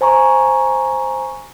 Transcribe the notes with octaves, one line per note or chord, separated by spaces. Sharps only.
C5 G#5 A#5 C#6